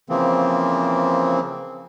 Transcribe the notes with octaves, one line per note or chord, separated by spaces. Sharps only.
C#3 E3 F3 A#3 C4